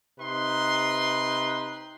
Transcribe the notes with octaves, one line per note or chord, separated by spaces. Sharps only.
C3 D#4 B4 C6